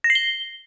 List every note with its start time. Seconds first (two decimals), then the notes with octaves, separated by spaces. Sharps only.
0.04 A#6
0.10 C7
0.15 G7